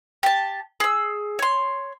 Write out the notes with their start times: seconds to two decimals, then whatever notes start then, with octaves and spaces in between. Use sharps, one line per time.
0.23 G4 A5
0.80 G#4 E6
1.39 C#5 C6